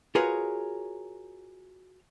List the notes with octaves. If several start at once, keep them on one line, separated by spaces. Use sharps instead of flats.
F4 F#4 G#4 A#4 B4 C#5